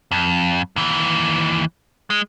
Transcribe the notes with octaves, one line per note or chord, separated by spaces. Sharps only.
F2
D#2 E3
G#3